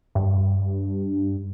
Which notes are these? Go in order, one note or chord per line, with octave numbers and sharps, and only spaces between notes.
G2